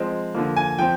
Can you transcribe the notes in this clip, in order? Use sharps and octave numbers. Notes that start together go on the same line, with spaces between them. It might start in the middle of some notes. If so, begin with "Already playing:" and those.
Already playing: F3 G#3 C4
D3 F3 A#3
G#5
F3 C4 G5